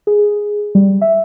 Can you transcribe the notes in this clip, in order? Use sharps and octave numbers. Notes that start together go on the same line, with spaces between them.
G#4
G3
E5